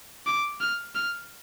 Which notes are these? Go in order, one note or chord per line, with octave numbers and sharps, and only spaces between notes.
D6
F6
F6